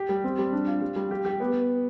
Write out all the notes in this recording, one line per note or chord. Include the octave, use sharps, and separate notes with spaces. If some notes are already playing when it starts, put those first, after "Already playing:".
Already playing: G4
G3
C4
G3
D4
F4
G3
G3
G4
G4
B3